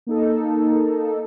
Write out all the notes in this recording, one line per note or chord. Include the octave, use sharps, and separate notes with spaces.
A#3 D#4 A4